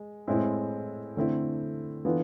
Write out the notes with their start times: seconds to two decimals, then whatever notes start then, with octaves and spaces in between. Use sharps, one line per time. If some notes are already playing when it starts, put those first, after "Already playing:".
Already playing: G#3
0.27 A2 G#3 C4 E4
1.17 D3 A3 C4 E4
2.05 E3 B3 D4 F4 A4